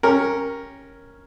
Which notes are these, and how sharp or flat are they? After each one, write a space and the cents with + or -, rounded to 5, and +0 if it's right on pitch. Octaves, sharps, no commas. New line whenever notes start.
C#4 -5 G4 +0 A#4 +0